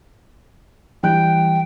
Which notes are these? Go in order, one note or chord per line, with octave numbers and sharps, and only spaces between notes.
E3 G3 G5 F#6